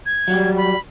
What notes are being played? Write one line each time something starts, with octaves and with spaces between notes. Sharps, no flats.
G#6
F#3 G3
B5